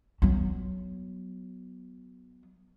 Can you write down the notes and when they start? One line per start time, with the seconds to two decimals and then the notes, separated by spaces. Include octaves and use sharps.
0.22 F#3 B3